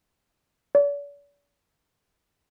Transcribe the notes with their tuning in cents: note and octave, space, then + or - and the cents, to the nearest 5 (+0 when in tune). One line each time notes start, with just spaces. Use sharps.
D5 -45